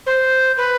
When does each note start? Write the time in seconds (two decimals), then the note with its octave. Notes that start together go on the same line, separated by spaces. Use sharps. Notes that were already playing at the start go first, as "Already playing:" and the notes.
0.06 C5
0.57 B4